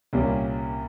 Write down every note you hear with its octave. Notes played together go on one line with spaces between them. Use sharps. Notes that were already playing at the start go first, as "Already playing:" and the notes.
C2 A#2 G3 A#3 C#4